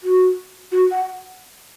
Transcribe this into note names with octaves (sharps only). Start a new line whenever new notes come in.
F#4
F#4
F#5